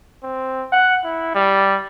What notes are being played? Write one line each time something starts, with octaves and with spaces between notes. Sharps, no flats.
C4
F#5
E4
G3